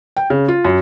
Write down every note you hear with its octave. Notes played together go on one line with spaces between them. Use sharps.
G5
C#3
F4
F#2